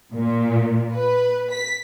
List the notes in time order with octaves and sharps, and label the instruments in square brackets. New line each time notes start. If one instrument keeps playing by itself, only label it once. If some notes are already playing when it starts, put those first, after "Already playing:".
[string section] A#2
B4
B6